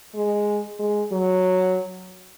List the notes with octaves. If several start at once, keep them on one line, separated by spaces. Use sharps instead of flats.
G#3
G#3
F#3